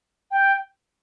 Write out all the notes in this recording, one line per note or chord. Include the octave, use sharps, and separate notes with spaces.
G5